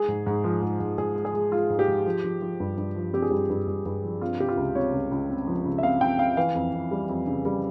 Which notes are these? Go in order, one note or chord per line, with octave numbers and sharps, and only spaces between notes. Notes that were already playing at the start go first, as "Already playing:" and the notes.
Already playing: G#3 G#4
G#2
G#2
F3
G#2
G#2
G#2 G#4
G#3
G#4
G#3
G#3 F4
G#2
G4
G#2
F3
F3
F3
G2
G2
F3
C4 G4
G#4
G2 G4
G2
G2
G2
F3
C4 F4
C3 G4
F4
C#2
C4 C#5
C#2
C#2
C4
F3
C#2
E5
C4 F5
C4 G5
C4 F5
E3 F5
F2
F2
G3
F2
C#3
G3